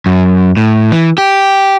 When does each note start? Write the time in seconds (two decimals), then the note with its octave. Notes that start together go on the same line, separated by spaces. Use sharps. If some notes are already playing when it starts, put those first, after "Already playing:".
0.06 F#2
0.57 A2
0.92 E3
1.18 G4